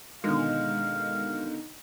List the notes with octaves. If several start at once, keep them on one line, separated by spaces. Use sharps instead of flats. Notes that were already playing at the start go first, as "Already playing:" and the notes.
B2 D3 D#3 G#3 F5